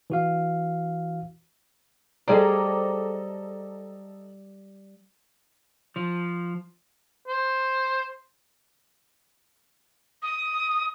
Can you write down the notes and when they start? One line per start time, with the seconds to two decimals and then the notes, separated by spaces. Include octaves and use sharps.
0.10 E3 F#4 F5
2.28 G3 G#4 A4 C5 D5 D#5 A#5
5.96 F3
7.28 C5
10.23 D#6